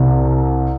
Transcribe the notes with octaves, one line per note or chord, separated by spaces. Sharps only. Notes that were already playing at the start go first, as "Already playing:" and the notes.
Already playing: C2 C3